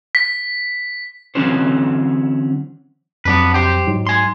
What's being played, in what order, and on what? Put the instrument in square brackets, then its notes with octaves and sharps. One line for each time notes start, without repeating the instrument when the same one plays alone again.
[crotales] B6
[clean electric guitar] D3 E3 F#3 C4 C#4 C5
[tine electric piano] F2 F#3 [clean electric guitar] B3 D4 B4
[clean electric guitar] G4 C5
[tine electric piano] G#2 F#3 D#4
[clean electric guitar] G#5 C6